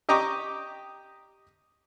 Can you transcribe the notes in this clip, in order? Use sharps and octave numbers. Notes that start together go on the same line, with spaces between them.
G4 D#5 G5 A#5 C#6 D6